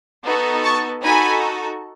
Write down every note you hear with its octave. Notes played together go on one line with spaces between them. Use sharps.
B3 D#4 F#4 A4
A5 C#6
D#4 F#4 A4 G#5 B5